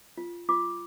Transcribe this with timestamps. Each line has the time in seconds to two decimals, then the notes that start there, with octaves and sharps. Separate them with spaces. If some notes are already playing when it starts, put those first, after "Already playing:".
0.18 F4
0.49 F4 D6